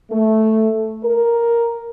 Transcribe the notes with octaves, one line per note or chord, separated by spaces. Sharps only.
A3
A#4